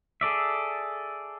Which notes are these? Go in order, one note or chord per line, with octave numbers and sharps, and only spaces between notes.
G#4 A4 D5 E5